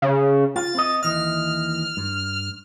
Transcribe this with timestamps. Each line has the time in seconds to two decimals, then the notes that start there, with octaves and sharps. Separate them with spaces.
0.02 C#3
0.56 F4 A6
0.75 C4 D#5
1.03 D#2 E3 D#5 F6
1.97 G2